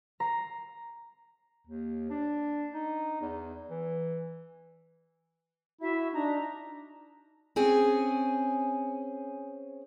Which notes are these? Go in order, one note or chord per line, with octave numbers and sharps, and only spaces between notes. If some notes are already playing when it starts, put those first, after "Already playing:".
A#5 C7
D#2
D4
D#4
E2
E3
E4 F#4 E5
D4 D#4 A#5
C4 C#4 G#4